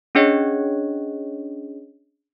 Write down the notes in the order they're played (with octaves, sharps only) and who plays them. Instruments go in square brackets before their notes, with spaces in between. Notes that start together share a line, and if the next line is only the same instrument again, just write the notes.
[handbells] C#4 D4 G#4 C#5 D#5